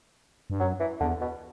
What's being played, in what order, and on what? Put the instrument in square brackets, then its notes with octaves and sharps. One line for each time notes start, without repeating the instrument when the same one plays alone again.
[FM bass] G2
[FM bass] F#2 [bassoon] F#3
[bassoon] E3
[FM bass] E2 [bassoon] D3
[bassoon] B2